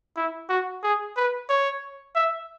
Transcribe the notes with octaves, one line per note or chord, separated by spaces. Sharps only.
E4
F#4
G#4
B4
C#5
E5